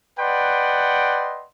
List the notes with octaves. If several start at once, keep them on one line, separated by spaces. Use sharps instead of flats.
B4 D5 D#5 F#5 G5 C6